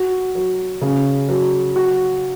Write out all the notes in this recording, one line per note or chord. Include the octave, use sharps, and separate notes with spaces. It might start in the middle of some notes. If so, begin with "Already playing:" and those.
Already playing: F#4
F#3
C#3
F#3
F#4